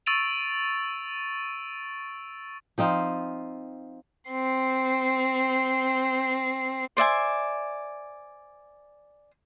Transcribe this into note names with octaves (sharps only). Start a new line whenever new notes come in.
C#6 E6 A6 D7 D#7 F7
F3 C4 D#4 F4
C4 C7
C5 D5 E5 G#5